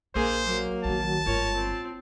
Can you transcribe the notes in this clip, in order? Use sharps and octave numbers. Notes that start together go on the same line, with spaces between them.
A#1 A#3 G#4 C5
F#3 A#3
A#1 D#3 A5
G1 G#2 F4 A#4 C#5
C4